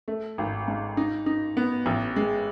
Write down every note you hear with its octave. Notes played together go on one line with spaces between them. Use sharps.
A3
G#1
G#2
D#4
D#4
B3
A1
G#3